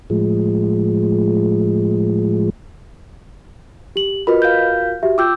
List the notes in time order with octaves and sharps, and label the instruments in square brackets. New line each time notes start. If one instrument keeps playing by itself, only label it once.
[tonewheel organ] A2 F3 G#3
[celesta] G4 F#7
[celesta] F4 F#4 A#4 [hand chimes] B4 D#5 B5
[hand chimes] F5 G6
[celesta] F#4 G4 E5
[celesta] F4 G5 [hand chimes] D6 E6 G6